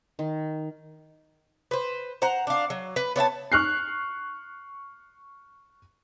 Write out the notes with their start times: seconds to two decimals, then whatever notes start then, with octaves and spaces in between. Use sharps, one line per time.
0.19 D#3
1.71 B4 C5
2.22 C5 F#5 A#5
2.47 D4 F5
2.70 F#3
2.96 B4
3.16 B3 C#5 F5 A5
3.52 C#6 F6 F#6 C7